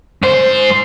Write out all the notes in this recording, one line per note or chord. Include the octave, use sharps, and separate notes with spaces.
G#2 C5